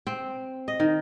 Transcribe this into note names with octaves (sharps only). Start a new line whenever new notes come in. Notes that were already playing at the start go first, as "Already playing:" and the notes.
C4
D#5
D#3